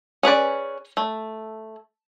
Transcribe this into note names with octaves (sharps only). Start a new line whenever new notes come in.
C#4 G#4 B4 D5
A3